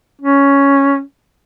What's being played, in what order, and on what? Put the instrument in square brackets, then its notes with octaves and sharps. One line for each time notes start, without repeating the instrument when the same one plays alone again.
[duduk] C#4